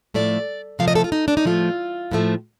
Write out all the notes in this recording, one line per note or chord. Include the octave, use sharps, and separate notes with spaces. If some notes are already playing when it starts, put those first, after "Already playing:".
A2 F3 A3 D5
C3 F3 A3 F5
D#5
A4
F4
D#4
D4
D#4
A2 F3 A3 F4
A2 F3 A3